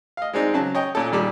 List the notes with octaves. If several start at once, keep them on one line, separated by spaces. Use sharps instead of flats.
D#5 F5
G#3 C4 D4 D#4
C#3 F#3 A5
C#5 D#5 G5
A#2 C#4 A4
D#2 A#2 G3 D6